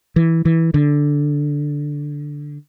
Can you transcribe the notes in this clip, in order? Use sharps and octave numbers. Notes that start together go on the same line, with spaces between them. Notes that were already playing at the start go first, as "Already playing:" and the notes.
E3
E3
D3